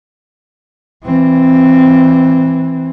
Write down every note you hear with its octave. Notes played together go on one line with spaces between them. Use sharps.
E3 C4